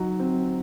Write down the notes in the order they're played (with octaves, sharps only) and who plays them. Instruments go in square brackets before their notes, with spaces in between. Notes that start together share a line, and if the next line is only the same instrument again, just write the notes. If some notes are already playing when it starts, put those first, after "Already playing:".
Already playing: [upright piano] F#3 D#4
C4